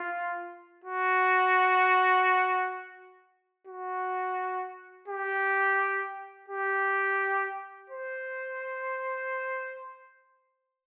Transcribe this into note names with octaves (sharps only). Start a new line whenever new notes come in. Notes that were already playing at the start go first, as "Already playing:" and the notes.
Already playing: F4
F#4
F#4
G4
G4
C5